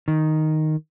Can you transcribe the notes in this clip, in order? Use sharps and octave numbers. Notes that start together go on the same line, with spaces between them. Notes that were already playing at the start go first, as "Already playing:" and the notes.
D#3